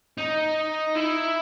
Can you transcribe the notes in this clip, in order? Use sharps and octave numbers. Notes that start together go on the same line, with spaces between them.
D#4
E4